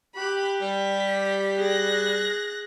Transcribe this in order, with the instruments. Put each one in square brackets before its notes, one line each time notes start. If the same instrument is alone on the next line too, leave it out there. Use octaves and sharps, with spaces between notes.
[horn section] G4 [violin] B5 F#6
[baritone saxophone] G3 [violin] B6
[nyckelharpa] G#4 [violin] F#6 A#6